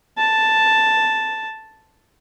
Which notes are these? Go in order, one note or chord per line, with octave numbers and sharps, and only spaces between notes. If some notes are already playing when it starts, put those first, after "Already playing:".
A5